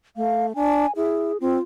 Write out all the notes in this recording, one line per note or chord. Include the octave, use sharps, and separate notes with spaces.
A3 F5
D4 G#5
E4 G#4
C4 F4